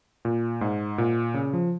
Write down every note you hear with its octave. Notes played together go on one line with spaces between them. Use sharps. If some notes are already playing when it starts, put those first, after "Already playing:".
A#2
G#2
A#2
C#3
F3